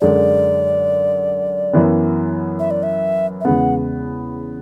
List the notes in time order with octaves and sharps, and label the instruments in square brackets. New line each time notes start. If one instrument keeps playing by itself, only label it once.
[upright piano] F#2 D3 G#3 [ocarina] D5
[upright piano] F#2 E3 B3
[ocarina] E5
D5
E5
E5
[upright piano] E2 C#3 G#3 B3 [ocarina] F#5